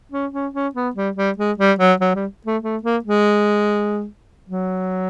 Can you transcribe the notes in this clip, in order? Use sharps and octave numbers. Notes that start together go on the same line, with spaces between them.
C#4
C#4
C#4
B3
G3
G3
G#3
G3
F#3
F#3
G3
A3
A3
A#3
G#3
F#3